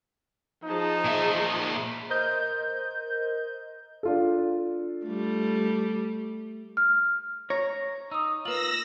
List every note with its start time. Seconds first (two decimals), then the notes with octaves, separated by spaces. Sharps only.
0.64 F3 D#4 G#4 A5
1.05 A#2 E5
2.09 A#4 C5 D#5 G6
4.03 D4 F4 A4
5.05 G3 A3
6.77 F6
7.50 C#5 A#5
8.11 D#4 D#6 E6
8.45 A#3 F4 B4 E6 A#6 F#7